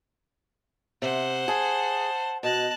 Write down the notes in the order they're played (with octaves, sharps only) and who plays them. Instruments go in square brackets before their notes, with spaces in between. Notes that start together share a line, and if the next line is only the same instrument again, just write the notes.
[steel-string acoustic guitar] C3 [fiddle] C5 F#5
[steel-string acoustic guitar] G#4 [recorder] A5
[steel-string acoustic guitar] B2 [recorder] D#5 [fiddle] A5 F#6